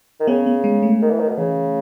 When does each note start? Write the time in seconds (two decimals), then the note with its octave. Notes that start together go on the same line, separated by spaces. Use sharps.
0.20 D#3
0.27 C#3 B3
0.46 B3
0.64 G#3
0.83 A3
1.02 D#3
1.11 E3
1.20 D#3
1.29 B2
1.38 C#3 E3